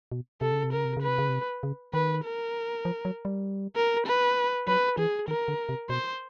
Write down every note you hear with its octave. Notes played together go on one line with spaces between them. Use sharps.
B2
C3 A4
C#3
C3
C#3 A#4
C3
C#3 B4
C3
C#3
C3
C#3
D#3 B4
A#4
F3
F#3
G3
A#4
B4
F#3 B4
E3 G#4
D#3 A#4
D3
C3
B2 C5